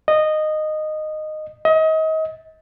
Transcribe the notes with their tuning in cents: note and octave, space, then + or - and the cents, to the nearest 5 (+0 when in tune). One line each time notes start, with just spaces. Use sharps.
D#5 -10
D#5 +35